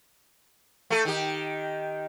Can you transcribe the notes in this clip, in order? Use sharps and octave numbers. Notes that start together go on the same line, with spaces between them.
A3 A4
D#3 G4